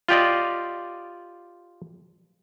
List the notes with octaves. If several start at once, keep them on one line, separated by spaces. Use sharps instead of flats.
F4 G4 D5 D#5